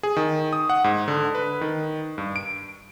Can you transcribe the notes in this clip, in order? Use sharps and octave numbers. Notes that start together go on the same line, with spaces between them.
G#4
D#3
D#6
F#5
G#2
D3
B4
D#3
G2
D7